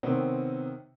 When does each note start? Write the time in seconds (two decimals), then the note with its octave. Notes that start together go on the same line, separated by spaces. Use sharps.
0.03 C3 D#3 B3 C4 C#5